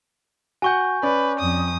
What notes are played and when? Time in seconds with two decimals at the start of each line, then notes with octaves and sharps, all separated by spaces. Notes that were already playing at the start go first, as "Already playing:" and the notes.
0.62 F#4 F#5 G#5 C#6 G6
1.03 C#4 B4 D5 D6
1.39 F2 D#6